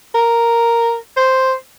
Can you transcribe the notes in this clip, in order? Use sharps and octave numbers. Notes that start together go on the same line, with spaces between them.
A#4
C5